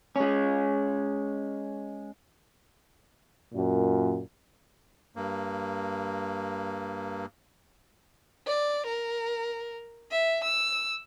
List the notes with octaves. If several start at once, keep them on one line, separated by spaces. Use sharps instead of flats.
G#3 C#4
F#2 A#2
G2 A#3
D5
A#4
E5
E6